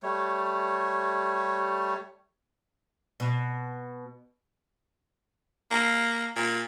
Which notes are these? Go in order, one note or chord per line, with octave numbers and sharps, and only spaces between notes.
G3 A3 C#5
B2
A#3
A#2